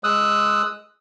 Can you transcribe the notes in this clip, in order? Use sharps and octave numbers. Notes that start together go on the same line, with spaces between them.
G#3 D#6 E6 F#6